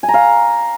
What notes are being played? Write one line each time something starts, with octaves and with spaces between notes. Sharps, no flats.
G#5
A#5
F5